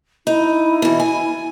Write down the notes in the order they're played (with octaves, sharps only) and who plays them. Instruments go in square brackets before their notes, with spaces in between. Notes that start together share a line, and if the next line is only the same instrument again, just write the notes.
[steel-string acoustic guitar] D#4 [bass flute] E4
[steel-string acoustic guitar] B2 E3
G#5